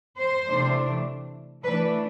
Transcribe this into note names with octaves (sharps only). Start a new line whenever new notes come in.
C5
C3 E3 A3 D4
E3 A3 D4 B4